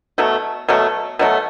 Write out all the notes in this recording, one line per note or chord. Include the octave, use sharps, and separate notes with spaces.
B2 F#3 A3
B2 F#3 A3
B2 F#3 A3